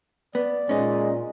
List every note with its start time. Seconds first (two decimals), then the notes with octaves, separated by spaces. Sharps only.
0.35 B3 D5
0.69 A#2 G#3 C#4 D#4